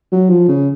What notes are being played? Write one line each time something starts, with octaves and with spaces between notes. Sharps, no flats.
F#3
F3
C#3